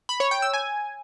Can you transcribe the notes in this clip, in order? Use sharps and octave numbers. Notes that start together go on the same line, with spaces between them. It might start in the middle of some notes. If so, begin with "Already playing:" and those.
B5
C#5
G5
E6
G#5